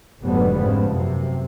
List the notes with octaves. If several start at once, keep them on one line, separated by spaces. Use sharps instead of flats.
F1 G#2 D3 F#3 G3 B3
G#2 C#3 F3
F#2 C3